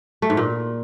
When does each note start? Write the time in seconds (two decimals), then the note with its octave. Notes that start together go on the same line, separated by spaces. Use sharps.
0.22 A3
0.30 G#2
0.37 A#2